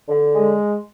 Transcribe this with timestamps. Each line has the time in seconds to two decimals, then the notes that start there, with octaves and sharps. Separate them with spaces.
0.08 D3
0.34 G#3